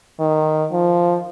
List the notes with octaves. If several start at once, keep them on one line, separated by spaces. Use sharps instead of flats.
D#3
F3